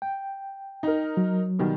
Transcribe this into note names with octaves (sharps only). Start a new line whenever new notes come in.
G5
D#4 A#4
F#3
B2 D#3 G3